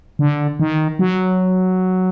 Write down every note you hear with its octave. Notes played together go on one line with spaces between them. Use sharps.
D3
D#3
F#3